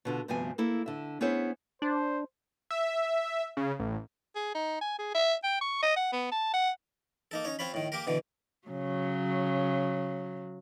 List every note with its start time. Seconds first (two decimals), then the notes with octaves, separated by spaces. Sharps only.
0.05 B2 D3 F4
0.28 D2 G2 C3 F3 B3 G#5
0.58 A#3 E4 A4
0.86 D3 E5
1.21 B3 C#4 E4 G#4 C5 C#5
1.82 D4 C5
2.71 E5
3.57 C#3
3.79 A1
4.35 G#4
4.55 D#4
4.81 G#5
4.98 G#4
5.14 E5
5.43 G5
5.61 C#6
5.83 D#5
5.96 F#5
6.13 B3
6.31 A5
6.53 F#5
7.31 A#3 D#4 A4
7.45 C#4 D#4 C#5
7.59 C4 F4 C#5 B5
7.74 A2 D#3
7.92 A#3 G4 A#4
8.07 B2 D3 E3
8.68 C#3 F#3